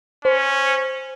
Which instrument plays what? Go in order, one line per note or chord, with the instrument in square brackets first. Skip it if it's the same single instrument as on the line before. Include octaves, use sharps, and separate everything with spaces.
[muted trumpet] C#4 [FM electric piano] C5